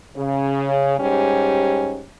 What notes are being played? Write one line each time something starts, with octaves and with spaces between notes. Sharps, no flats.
C#3
G#2 G3 C#4 G4